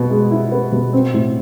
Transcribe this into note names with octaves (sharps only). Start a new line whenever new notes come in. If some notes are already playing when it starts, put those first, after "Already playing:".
Already playing: B2 B3
G#3
E4
B3
B2
C4
A2